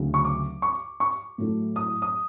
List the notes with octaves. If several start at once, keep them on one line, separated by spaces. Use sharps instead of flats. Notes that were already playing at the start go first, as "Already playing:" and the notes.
Already playing: D2 C#3 F#3
C#6
D6
C#6
C#6
A2 F#3 A3
D#6
D#6